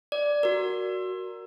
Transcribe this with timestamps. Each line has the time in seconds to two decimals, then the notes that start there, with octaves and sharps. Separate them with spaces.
0.12 D5
0.43 F#4 A#4